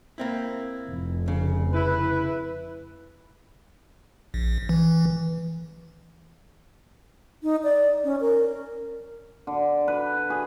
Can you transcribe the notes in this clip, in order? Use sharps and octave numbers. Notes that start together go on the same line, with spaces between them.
A#3 C4 E4
F1
C#3
E4 B4
A#1
E3
D#4
D5
C#4
A#4
D3
B4
G#4